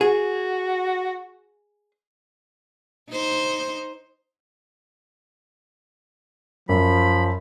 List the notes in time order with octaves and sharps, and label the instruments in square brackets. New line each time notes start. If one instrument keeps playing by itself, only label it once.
[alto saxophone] F#4 [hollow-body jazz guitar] G#4
[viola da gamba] D#4 C5
[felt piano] F#2 [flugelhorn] F3 [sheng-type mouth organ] B5